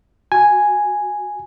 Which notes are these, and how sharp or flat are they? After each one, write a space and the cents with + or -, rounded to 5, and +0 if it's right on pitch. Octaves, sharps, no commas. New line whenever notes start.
F#4 +0 G#5 +0